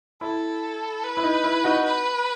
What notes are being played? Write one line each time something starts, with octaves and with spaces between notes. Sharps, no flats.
E4 A4
B4
E4
D#4
E4
D#4 F#4
B4